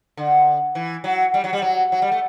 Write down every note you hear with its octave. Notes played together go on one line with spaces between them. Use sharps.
D3
E3
F#3
G3
F#3
G3
F#3
F#3
G3
A3